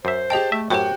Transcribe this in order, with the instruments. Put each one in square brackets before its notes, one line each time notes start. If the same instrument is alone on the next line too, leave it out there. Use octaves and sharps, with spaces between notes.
[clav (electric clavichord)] F#2 E5 [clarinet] C5
[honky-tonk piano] G4 A5 [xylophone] G#4 D#5 G5
[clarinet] A3 [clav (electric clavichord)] E5
[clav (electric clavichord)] F#2 A2 [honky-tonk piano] F#4 [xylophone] G4 C5 C#5 [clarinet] G5